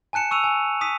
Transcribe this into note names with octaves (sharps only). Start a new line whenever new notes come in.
G#5 A5 F#6 C#7 E7
C#6 E6 D#7 F7
G#5
D#6 B6 D#7